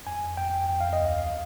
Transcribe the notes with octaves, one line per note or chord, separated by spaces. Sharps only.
F2 G#5
F2 G5
F2 G5
F5
D#5
D2
F5